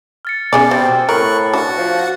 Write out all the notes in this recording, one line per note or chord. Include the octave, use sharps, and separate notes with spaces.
F6 A6 C#7
B2 C#4 G#4 D5
G3 C4
A2 A#4 C#6 F#6
D4 F#4 F#5
F3